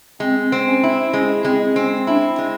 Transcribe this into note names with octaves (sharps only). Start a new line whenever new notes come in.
G#3 C4
C4
C#4
E4
G#3 C#4
G#3 C4
C4 C#4
D4 E4
G#3